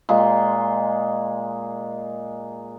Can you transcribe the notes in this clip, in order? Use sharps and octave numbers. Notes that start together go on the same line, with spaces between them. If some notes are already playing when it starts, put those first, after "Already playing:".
A#2 G#3